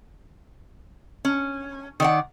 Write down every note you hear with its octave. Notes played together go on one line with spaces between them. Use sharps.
C#4
D#3 D5 F#5